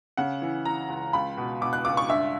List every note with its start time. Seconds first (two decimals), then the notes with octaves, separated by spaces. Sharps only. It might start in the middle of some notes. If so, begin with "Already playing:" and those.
0.17 C#3 F#5
0.42 E3
0.65 E3 A#5
0.89 C#2
1.13 C#2 B5
1.37 B2
1.61 B2 D6
1.73 F#6
1.85 C#2 D6
1.97 C#6
2.09 G2 E5